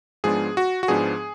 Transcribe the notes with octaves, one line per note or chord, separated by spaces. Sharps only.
G#2 F3 G#3 B3 D4 G#4
F#4
F#4
G#2 F3 G#3 B3 D4 G#4